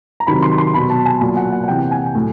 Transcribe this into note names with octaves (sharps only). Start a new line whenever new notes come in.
A#5
C3 D#3 F#3 B5
C6
C6
B2 F#3 B5
A5
G#5
A#2 F#3 G#5
F#5
F#5
F#5
C3 E3 G5
G#5
A2 F#3